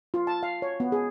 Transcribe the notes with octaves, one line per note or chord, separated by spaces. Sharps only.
F4
A5
F5
C#5
B3
G#4